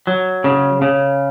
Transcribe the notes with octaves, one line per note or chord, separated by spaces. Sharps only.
F#3
C#3
C#3